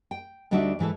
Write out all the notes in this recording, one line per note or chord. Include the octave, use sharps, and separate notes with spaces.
G5
D2 G3 D4 D#4 F#4 E5
G#2 E3 E4 A4